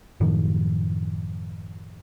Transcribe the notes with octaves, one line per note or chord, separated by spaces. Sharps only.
F#2 A2 D#3 F3